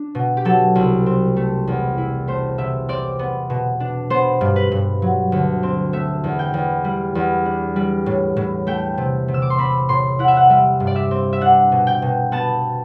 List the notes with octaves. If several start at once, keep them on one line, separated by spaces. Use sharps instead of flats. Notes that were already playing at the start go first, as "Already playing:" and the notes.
Already playing: D4
B2
G4
F#3 A4
C2
C4
A3
E2
E4
A3 C5
C3 E5
C4 D5
B3
B2
D4
B3 C5
G2
B4
G2
F#3
D2
C4
A3 E5
E2
G5
E2
G3
E2
D4
G3
A2
A2
A3 G5
C3
C3
E6
D6
C6
C4 B5
A2 C6
E4 F#5
E5
F#5
G3 E5
G2
D5
E5
C4
E5
D4 F#5
B2
G5
B2
B3 A5